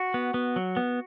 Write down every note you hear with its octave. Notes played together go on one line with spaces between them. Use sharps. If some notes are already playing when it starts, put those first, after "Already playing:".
Already playing: F#4
B3
B3
F#3
B3